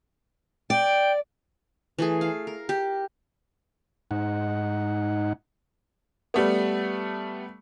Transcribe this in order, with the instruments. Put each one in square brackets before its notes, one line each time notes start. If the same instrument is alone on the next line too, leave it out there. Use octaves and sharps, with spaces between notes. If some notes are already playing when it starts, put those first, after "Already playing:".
[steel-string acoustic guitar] D5 [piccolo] G5
[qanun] E3 A3 G#4
F5
A#4
G4
[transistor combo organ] G#2 D#4 F#5
[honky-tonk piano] G3 A3 B3